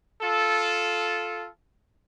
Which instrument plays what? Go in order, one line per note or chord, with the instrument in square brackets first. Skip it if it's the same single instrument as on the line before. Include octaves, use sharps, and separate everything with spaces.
[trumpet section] F4 A4